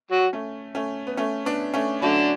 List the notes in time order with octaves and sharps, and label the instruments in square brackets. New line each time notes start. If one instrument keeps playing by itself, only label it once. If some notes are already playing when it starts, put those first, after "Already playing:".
[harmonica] F#3 F#4
[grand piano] A3 C#4
A3 C#4
B3
A3 C#4
B3 D4
A3 C#4
[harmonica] D3 D4 [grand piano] F#3 A3